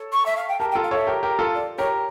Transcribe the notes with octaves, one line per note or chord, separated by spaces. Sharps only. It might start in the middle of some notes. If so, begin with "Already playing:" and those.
Already playing: A4 C#5
C#6
E5
F5
G5
G4 A#4 A5
G5
F4 A4
F5
A4 C#5 E5
G4 A#4
G4 A#4
F4 A4
D5
G4 A#4 C#5